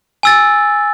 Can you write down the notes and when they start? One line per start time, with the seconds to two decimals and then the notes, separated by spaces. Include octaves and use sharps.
0.23 G#5 E6 A6